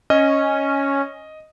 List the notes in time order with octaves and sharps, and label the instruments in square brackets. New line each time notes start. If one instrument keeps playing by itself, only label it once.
[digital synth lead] C#4 [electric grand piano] D#5